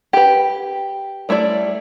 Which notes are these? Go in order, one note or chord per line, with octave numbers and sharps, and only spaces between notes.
G4 B4
G3 A3 E4 D5